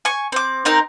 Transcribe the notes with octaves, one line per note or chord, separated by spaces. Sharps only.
G#5 C#6
C4 D6
C4 D#4 A#4 A#5